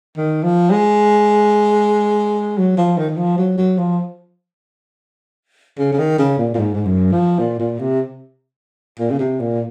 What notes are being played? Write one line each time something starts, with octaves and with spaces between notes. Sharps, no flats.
D#3
F3
G#3
F#3
F3
D#3
D#3
F3
F#3
F#3
F3
C#3
C#3
D#3
C#3
A#2
A#2
G#2
G#2
F#2
F3
A#2
A#2
C3
A#2
C#3
C3
A#2